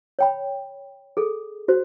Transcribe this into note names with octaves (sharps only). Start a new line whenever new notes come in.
C#5 G5 B5
G#4 A4
F#4 C5